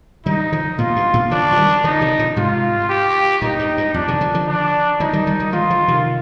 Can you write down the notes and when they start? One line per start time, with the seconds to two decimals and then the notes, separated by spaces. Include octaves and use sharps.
0.26 D#3 G3 D#4
0.52 D3 F3
0.78 G2 A#2 F4
0.96 G2
1.13 G2 A#2
1.31 D3 F3 D4
1.52 F3
1.57 D#3 G3
1.84 D3 F3 D#4
2.01 C3 D#3
2.19 A#2 D3
2.36 G#2 C3 F4
2.89 G4
3.42 G2 A#2 D#4
3.59 G2
3.77 G2
3.94 F2 D4
4.08 C3 D#3
4.21 D3 F3
4.34 D3 F3
4.47 D4
5.00 D3 F3 D#4
5.13 D#3 G3
5.27 D#3 G3
5.39 D#3 G3
5.52 F3 G#3 F4
5.70 D3 F3
5.88 C3 D#3